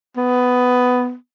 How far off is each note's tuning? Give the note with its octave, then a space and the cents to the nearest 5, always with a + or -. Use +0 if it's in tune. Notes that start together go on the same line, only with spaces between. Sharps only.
B3 +10